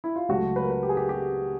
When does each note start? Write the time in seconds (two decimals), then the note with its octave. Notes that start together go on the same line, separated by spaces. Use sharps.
0.04 E4
0.16 F4
0.29 C#2 C#3 F#3 A3 F#4
0.56 B4
0.63 A#4
0.70 B4
0.83 G4
0.89 G#4
0.97 G4
1.09 G4